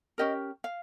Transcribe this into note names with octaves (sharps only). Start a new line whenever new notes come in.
C#4 G4 A#4 D#5
F5